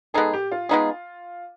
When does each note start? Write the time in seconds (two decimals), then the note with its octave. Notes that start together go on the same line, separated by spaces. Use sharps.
0.14 G#3 B3 D#4 G#4 A4
0.33 G4
0.51 F4
0.69 G#3 B3 D#4 G#4